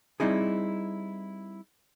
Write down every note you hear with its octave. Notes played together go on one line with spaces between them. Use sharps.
G3 C4 D#4 E4 G#4